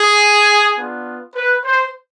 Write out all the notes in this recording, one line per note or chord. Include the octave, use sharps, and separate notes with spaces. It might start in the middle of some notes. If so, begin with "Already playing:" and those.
Already playing: G#4
B3 D4 F4
B4
C5